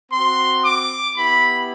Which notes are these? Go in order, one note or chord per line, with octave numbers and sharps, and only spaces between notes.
C4 F#4 C6
D6
B3 E4 G4 B5